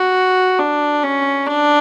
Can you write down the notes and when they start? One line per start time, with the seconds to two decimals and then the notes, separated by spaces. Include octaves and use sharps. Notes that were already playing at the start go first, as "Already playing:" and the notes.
Already playing: F#4
0.59 D4
1.03 C#4
1.47 D4